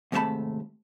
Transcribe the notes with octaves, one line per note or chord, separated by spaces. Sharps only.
D#2 G#2 C3 A3 A5 B5